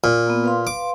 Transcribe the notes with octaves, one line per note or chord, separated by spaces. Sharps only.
A#2
A#3 B3
B4 F5 C6
D6